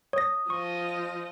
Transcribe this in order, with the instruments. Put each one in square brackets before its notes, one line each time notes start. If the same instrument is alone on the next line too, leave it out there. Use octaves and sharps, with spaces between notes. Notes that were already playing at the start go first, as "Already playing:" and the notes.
[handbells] C#5 A#6 [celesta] D#6
[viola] F3 D#5 [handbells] C#6